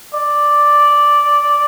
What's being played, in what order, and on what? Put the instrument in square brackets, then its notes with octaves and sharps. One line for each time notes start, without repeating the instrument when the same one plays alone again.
[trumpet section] D5